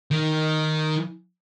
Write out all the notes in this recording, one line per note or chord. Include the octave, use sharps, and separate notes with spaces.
D#3